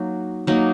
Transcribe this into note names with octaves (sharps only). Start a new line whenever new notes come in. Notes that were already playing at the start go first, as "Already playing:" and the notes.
Already playing: F#3 A#3 D#4
F#3 A#3 D#4